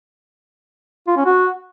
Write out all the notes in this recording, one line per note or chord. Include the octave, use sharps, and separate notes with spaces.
F4
C#4
F#4